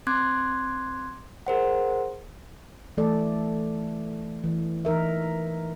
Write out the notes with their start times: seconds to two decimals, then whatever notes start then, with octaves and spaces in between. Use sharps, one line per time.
0.07 C4 C6 D6 F#6 G#6
1.47 G#4 A#4 C5 F#5
2.97 E3 A3 A4 D5
4.44 E3
4.85 E3 D#4 A#4 E5